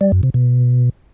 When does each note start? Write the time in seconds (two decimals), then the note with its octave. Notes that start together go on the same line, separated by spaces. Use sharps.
0.01 G3
0.12 F#2
0.23 C3
0.34 B2